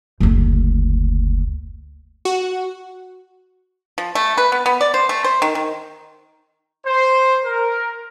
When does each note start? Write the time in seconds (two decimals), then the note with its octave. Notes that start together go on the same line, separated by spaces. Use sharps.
0.20 F#1 D2
2.25 F#4
3.98 F3
4.15 A3
4.38 B4
4.52 B3
4.66 B3
4.81 D5
4.94 C5
5.09 A3
5.24 C5
5.42 D#3
5.55 D#3
6.85 C5
7.44 A#4